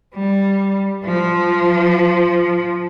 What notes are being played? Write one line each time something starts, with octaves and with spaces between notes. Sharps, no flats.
G3
F3